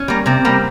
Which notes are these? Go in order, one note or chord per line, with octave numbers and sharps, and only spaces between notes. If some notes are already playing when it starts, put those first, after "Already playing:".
Already playing: C#4
G3 A#3
C3 C4
G3 A#3